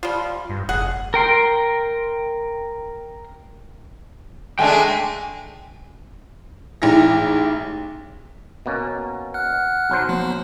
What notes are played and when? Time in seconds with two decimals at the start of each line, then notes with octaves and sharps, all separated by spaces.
0.03 F3 G3 F4
0.50 G2
0.69 F1 G#4 F#5
1.14 A#4 G5 C6
4.59 G#3 A3 D4 G5 G#5
6.82 A1 G#2 E4 A#6
8.66 B2 A#3 C#4
9.34 F#5 F6 F#6
9.90 B1 F#3 C5
10.09 F3 A#3 B3